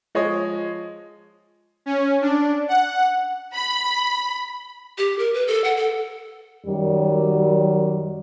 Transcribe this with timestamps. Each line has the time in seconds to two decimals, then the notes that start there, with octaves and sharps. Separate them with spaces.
0.15 F3 G#3 C#5 D#5
1.86 C#4
2.22 D4
2.68 F#5
3.54 B5
4.98 G4
5.19 A#4
5.34 B4
5.47 A4
5.64 F#5
5.77 A4
6.66 F#2 D#3 F#3 G3